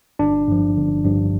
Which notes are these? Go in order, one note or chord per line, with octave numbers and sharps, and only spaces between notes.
G1 D4
G2 F3
G1
G2 F3